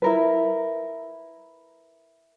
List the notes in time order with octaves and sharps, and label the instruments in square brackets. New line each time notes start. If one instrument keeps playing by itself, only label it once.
[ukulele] E4 A#4 B4